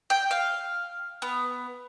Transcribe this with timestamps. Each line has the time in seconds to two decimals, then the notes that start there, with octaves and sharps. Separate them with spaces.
0.10 G5
0.31 F5
1.22 B3